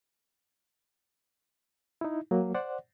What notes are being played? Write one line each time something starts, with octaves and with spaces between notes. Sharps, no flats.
D#4 E4
F#3 A#3
C5 D5 F#5